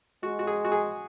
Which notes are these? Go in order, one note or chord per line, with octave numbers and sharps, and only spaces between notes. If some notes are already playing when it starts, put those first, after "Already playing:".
G#3 F#4
F#4
G#4
F#4
G#4